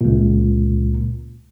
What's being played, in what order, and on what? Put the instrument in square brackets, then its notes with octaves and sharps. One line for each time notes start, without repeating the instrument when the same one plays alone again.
[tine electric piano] C#2 A#2